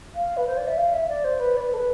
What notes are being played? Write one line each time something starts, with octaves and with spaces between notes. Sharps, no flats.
F5
B4
C5
D5
E5
F5
E5
D5
C5
B4
D5
B4
A4
B4